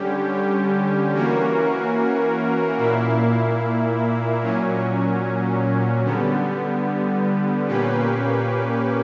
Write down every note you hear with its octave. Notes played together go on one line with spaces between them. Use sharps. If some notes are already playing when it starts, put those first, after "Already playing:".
Already playing: D3 G3 C#4 G4
E3 A#3 C#4 F#4 A#4
A#2 A#3 E4
A#2 F#3 C#4
D3 G3 B3
A#2 A#3 C#4 G4 B4